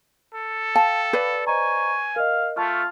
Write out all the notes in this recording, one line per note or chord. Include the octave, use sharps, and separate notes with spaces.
A4
F5 G5 A5
B4 D5
C5 D#5 G#5 A#5 C#6
A#4 D#5 F5
A3 F4 A5 C#6 F6